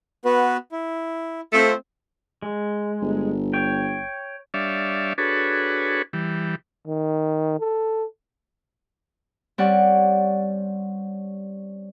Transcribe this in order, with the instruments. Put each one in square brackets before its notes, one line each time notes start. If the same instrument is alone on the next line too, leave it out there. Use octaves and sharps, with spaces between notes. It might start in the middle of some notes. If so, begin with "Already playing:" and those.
[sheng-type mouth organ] B3 F#4 B4
E4
[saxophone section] A3 C4 [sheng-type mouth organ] F4
[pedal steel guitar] G#3
[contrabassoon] G1
[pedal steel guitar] C#5 G5
[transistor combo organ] G3 D4 C#5 D5 E5 F5
D4 F#4 G#4 A4 B4 C#5
E3 G3
[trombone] D#3
A4
[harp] G3 C4 C#4 C#5 D5 F#5